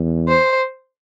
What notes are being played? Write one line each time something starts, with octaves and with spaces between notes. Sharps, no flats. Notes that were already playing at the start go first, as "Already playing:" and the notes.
Already playing: E2
C5